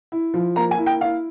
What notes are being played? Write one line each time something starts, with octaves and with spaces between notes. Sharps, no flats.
E4
F3
A#3 A#5
G#5
E4
G5
E4 F5